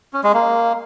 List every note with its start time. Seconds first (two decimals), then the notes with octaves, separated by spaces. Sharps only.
0.13 C#4
0.24 G#3
0.34 A#3